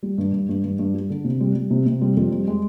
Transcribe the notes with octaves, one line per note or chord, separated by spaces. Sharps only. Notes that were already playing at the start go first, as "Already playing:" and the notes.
G3
G2
G2
G2
G2
G2
G3
D3
C3
G3
G3
C3
C3
G3
F2
G3
G#3